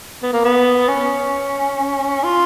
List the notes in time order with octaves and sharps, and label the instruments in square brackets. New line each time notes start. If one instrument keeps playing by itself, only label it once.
[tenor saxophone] B3
A#3
B3
C#4
F4